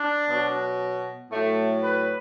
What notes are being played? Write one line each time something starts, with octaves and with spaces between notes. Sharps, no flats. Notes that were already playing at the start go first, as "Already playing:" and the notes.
Already playing: D4
B2 F#3
A2 F#3 A3
B4